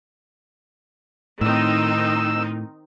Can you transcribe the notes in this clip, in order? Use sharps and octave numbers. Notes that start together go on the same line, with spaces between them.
A2 D#3 C4 D#4 E6